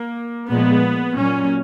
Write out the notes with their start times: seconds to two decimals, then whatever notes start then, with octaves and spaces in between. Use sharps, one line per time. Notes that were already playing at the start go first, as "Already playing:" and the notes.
Already playing: A#3
0.50 A#2 F3 G#3 B3
1.19 A#2 F#3 C#4